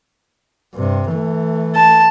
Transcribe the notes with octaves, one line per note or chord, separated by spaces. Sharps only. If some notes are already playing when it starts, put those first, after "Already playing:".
G2 C3
E3 A3
A5